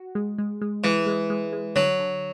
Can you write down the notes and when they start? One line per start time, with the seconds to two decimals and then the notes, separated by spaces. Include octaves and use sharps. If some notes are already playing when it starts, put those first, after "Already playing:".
Already playing: F#4
0.15 G#3
0.38 G#3
0.61 G#3
0.84 E3 G#3
1.06 G#3
1.30 G#3
1.53 G#3
1.76 D3 F#3
1.99 D3